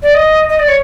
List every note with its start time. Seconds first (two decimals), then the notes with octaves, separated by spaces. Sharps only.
0.02 D5
0.14 D#5
0.49 D#5
0.59 D5
0.68 C#5